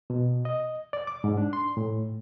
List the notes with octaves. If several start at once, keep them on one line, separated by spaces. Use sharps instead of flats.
B2
D#5
D5
D6
G#2
D4
C6
A2